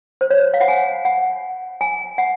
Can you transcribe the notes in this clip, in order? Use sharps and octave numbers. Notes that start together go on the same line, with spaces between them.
C5
C#5
F5
F#5
G#5
F#5
G#5
F#5